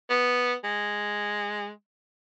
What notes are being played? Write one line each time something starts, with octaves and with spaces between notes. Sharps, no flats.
B3
G#3